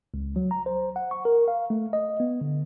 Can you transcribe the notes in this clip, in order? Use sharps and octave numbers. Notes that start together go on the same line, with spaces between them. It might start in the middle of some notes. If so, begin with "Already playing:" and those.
C#2
F#3
A#5
C5
F#5
C#6
A#4
F5
A3
D#5
B3
D3